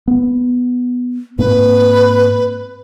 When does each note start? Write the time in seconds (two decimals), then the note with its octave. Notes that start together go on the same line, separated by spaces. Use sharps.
0.08 B3
1.39 G#2 A#3 C4 B4